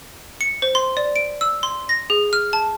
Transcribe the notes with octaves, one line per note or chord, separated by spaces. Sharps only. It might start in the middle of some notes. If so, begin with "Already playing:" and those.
C#7
C5
C6
D5
D7
E6
C6
A#6
G#4
F6
A5